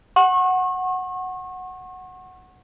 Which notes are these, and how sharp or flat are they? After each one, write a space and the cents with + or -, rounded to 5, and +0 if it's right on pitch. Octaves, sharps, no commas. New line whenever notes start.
F#5 +0 C#6 -35